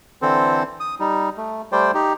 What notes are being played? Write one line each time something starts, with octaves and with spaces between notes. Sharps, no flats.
D3 E3 C4 A4 C5
D#6
G3 D#4
A3
G3 A3 C5 D5 G5
D#4 G4